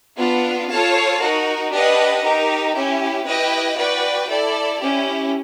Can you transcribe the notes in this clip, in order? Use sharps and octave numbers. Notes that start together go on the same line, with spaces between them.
B3 D4 F4
F4 A4 C#5 F5 A5
D#4 F#4 A#4
D4 G4 B4 D#5 F#5
D#4 G4 A#4
C#4 E4 G4
E4 G4 B4 D#5 G5
F#4 B4 D5 G5
E4 A4 D5
C#4 E4 G4